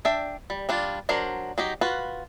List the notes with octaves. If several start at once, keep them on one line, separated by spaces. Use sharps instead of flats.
D4 E5 G5
G3
G3 D4 F4
F#3 D4 A#4 C5
F#3 D#4 G4
F4 F#4 B4